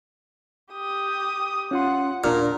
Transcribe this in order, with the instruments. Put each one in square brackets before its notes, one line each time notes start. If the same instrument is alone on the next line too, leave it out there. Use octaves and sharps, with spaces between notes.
[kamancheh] G4 D#6
[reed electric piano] C#4 F4 C6 [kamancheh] F#5
[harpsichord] A#2 [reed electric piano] D4 F6 [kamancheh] A#4